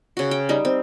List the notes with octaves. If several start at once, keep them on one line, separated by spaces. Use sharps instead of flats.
C#3 F#4
G5
G3 D#4
C4